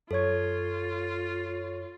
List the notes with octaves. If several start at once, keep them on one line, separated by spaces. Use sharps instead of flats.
F#2 F4 A4 C#5 C#6 G#6